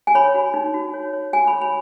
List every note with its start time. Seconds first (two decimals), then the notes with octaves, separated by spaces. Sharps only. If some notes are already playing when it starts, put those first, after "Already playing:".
0.07 G#5
0.15 C#5 B5
0.35 F#4
0.54 D#4
0.74 F#4
0.94 C#5
1.13 C#5
1.33 F#4 G#5
1.47 B5
1.53 C#5
1.62 B5